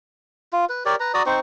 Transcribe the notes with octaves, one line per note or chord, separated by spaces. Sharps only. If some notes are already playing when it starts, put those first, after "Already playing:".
F4
B4
G4 A#4 C#5 D5
B4 A#5
F#4 D5 A#5 D#6
C4 D#4 C5 C#6